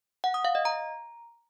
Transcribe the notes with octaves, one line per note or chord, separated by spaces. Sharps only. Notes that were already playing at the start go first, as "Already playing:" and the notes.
F#5
D#6
F5
D#5
A#5